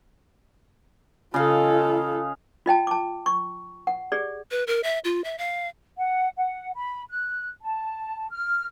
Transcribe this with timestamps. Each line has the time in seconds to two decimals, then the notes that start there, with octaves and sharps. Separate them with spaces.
1.34 C#3 F4 A4 D#5 F5
2.66 F4 D#5 G5 A5
2.87 A5 D6
3.26 C#6
3.87 F#5
4.12 G4 G#4 D5
4.51 B4
4.67 A#4
4.83 E5
5.05 F4
5.24 E5
5.38 F5
5.97 F#5
6.37 F#5
6.75 B5
7.10 F#6
7.62 A5
8.30 F6